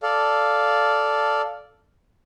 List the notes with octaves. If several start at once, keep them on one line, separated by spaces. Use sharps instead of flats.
A4 D5 F5